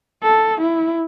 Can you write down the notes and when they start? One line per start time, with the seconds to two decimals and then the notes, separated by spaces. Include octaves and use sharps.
0.23 A4
0.61 E4